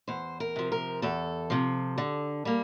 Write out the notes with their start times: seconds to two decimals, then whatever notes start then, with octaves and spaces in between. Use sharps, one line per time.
0.08 E2 C5
0.40 A#4
0.56 C3 F3
0.72 A#4
1.02 E2 A4
1.50 C3 F3
1.98 D3
2.45 G3 A#3